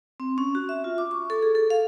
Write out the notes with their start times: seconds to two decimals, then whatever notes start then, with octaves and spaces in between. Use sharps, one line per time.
0.20 C4
0.38 C#4
0.55 F#4
0.69 E5
0.84 F4
0.98 D6
1.11 C#6
1.30 A4
1.42 G#4
1.55 A4
1.70 F5